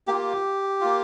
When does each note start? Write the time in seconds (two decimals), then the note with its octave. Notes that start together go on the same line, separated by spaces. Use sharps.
0.07 A#3 F4 G4
0.81 A#3 F4